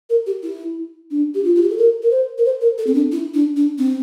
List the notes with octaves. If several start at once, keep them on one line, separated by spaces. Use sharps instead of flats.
A#4
G4
E4
D4
G4
F4
F4
G4
A4
A#4
A#4
C5
A#4
C5
A#4
A4
C4
D4
E4
D4
D4
C4